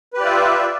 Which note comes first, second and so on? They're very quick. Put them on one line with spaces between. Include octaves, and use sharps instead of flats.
B4 G4 D5 F4 E5